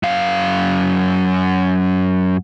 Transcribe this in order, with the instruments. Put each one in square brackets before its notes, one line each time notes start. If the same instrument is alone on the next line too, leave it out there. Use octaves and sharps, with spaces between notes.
[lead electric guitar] F#2 F5